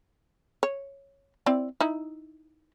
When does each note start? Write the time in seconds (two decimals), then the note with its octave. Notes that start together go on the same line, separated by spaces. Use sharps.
0.63 C#5
1.46 C4 E4 D5
1.80 D#4 E4